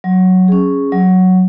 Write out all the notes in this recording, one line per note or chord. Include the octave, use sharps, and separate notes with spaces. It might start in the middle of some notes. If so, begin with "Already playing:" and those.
F#3
C#4 G#4
F#3